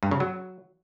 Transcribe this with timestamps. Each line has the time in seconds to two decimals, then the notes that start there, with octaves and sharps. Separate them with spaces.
0.03 G2
0.11 C#3
0.20 F#3